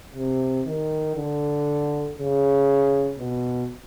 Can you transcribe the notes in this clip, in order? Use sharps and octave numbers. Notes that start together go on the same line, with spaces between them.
C3
D#3
D3
C#3
B2